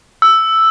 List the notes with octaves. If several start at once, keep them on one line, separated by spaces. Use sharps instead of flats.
E6